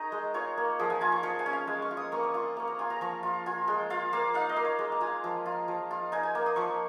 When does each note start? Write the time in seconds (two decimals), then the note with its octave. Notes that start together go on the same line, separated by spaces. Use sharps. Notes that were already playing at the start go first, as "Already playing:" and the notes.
Already playing: D#4 G#4 A#4 C#5 D#5
0.12 G#3
0.34 F4 C#5
0.58 A#3
0.79 F3 G#4
0.90 G#5
1.01 F4 G#5
1.12 C#6
1.23 F3 C#6
1.39 G#5
1.46 C#4
1.53 F5
1.67 G#3 G#5
1.82 C#6
1.91 F4
1.97 D#6
2.12 A#3 C#6
2.23 D#6
2.34 F4 C#6
2.57 A#3 C#6
2.68 A#5
2.79 F4 G#5
2.90 A#5
3.01 F3 C#6
3.23 F4
3.46 F4 G#5
3.68 G#3
3.90 F4 F5
4.13 A#3 F5
4.34 D#4 F5
4.49 D#5
4.56 A#3
4.65 C#5
4.79 G#3
4.92 A#5
5.01 F4 G#5
5.24 F3
5.46 F4
5.68 F3
5.91 F4
6.12 D#4 G#5
6.23 G#5
6.35 A#3
6.46 D#6
6.56 F3 C#6